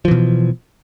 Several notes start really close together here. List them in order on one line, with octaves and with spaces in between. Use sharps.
F3 E3 B2